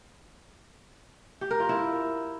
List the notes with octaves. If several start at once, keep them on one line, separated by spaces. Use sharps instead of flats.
G4
A#4
F4
E4